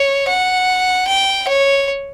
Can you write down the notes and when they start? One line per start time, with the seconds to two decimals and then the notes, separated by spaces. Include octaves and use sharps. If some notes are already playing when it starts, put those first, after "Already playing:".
Already playing: C#5
0.28 F#5
1.07 G5
1.48 C#5